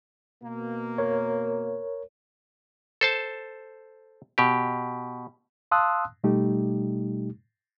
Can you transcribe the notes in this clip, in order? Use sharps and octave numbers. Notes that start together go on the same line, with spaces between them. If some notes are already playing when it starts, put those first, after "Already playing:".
B2 A#3
A#4 C#5
A4 C5 A5
B2 G4
F5 A5 C6 D#6 E6 F#6
B2 G3 A3 D#4 G4